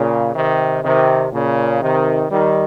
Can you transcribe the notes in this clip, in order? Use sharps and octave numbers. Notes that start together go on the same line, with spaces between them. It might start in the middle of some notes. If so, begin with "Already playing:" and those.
Already playing: A#2 C#3
C3 D#3
C3 D#3
A#2 C#3
C3 D#3
D#3 G3